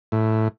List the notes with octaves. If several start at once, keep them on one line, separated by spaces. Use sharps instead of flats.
A2